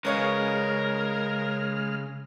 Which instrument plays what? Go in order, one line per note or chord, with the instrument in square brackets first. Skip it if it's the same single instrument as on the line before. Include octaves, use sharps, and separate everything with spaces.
[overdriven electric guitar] C#3 [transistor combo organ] G#3 F6 [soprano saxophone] A#4 [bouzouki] B4 C#5 D#5